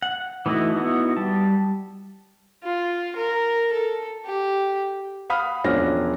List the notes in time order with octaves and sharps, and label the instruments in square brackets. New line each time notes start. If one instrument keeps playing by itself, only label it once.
[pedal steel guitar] F#5
E3 A3 D#4 E4 F#4
B3 D#4 E4 F#4
G3 A5
[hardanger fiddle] F4
A#4
A4
G4
[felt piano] F5 F#5 B5 D#6 F6
E1 F3 C#4 D4 F6 A#6